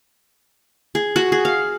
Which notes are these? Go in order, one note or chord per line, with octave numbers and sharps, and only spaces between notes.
G#4
F#4
G#4
F5